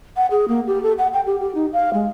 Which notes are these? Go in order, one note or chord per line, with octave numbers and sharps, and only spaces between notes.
F#5
G#4
A#3
G4
A4
F#5
G5
G4
G4
D#4
F5
G#3